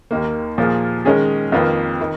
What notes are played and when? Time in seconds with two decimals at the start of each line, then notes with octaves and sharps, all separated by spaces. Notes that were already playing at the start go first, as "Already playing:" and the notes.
0.11 D#2 D#3 A#3
0.58 A#2 F3 A#3 F4 G#4
1.05 D#3 G#3 C#4 G#4
1.52 F2 D#3 A#3 F4 B4
2.01 D#3